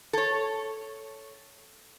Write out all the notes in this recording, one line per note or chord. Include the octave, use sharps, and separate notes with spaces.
A4 C#5